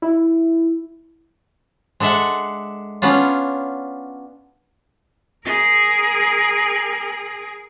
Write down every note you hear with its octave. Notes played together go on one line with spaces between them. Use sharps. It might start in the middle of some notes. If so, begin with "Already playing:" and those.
E4
G#3 D4 A4 E5 F#5
B3 C#4 D4 F4
G#4 A#4